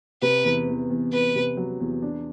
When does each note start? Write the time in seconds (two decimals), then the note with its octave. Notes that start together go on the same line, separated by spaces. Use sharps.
0.22 C3 B4
0.44 E2
0.67 E2
0.90 E2
1.13 E2 B4
1.35 C3
1.57 F#3
1.80 E2
2.02 D4